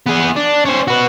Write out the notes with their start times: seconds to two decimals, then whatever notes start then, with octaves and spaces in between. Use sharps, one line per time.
0.07 B3 G#4
0.37 D4
0.65 C#4 C5
0.87 F#4 B4